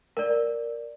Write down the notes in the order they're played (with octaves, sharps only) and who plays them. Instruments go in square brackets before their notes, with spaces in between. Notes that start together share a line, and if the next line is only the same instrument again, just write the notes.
[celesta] A#4 D5